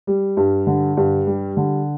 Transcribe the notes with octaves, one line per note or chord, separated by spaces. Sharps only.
G3
G2
D3
G2
G3
D3